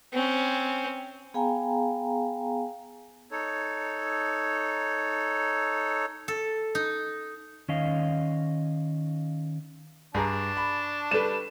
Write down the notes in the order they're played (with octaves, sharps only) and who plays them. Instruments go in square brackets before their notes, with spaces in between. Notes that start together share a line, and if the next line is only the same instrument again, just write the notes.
[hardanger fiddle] C4 C#4
[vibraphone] B3 G#4 F5 G5 G#5 A#5
[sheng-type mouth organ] D#4 A4 C#5
[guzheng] A4
D#4
[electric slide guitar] D#3 C#4 D#5 F5
[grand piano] G2 G#4 A#5 [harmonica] D4 A5 C#6
[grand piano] B5
[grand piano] G3 B4 [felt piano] A4 E7